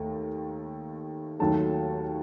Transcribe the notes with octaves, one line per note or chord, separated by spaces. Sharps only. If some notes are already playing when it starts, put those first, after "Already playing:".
Already playing: D#2 D#3 A3
D#2 D#3 F#3 A3 A5